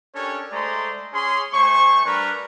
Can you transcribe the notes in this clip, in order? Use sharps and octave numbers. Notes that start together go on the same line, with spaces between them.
C#4 D4 G4 A4 A#4 C#5
G#3 A3 C5 D5 A#5 C6
C#4 G#4 C6
A3 C5 G#5 C#6
G3 D4 A#4 B4